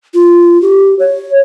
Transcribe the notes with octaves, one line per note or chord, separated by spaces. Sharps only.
F4
G4
C#5